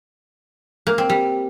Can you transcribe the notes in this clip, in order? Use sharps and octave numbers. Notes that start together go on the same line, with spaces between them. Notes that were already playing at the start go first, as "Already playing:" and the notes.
A#3
C4
G3